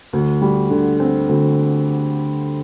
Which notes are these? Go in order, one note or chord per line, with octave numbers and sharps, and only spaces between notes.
D2
G3
D3
C4
D2